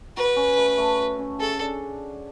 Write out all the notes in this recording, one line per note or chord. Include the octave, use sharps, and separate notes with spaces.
F#4 B4
C#4
A3
A3
F#4
C#4
G#4 A4
D4